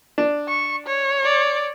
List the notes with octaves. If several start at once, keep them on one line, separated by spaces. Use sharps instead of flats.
D4
C#6
C#5
D5